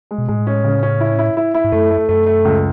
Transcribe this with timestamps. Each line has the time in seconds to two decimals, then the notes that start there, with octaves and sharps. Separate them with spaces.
0.11 G#3
0.18 B2
0.28 A2 G#3
0.47 C#4
0.64 C#3
0.83 C#4
1.00 E4
1.19 E4
1.37 E4
1.54 E4
1.64 G#2
1.72 F#2 A3
1.91 A3
2.09 F#2 A3
2.26 A3
2.45 C#2